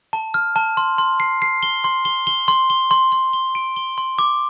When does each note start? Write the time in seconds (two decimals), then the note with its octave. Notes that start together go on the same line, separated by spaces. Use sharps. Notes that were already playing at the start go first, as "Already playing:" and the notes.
0.13 A5
0.34 F6
0.56 A5
0.77 C6
0.98 C6
1.20 C7
1.42 C7
1.63 G7
1.84 C6
2.05 G7
2.27 G7
2.48 C6
2.70 G7
2.91 C6
3.12 C6
3.33 G7
3.55 D7
3.76 G7
3.98 C6
4.19 D6